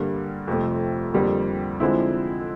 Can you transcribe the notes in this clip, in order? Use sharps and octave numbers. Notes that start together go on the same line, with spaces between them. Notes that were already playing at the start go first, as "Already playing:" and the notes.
Already playing: G2 D3 G3 A#3
F2 C3 F3 A3
F2 D3 G3 A#3
D3 F3 G#3 C4 E4